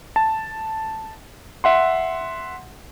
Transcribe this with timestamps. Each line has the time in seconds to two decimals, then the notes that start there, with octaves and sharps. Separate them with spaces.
0.16 A5
1.64 E5 F#5 C6